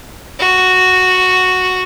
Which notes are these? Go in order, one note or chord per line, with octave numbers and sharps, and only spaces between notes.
F#4